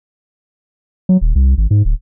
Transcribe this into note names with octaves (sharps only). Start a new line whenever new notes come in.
F#3
D#1
C2
G#1
G#2
D1